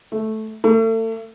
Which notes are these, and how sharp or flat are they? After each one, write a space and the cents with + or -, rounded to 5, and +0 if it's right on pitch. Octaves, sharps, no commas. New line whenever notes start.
A3 -10
A3 +35